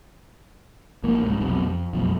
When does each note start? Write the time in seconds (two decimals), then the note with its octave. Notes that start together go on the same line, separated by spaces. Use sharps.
1.03 A#1 E3 A#3
1.22 C2 G#2
1.41 B1 F2 C3
1.63 F2
1.93 F#1 B1 F2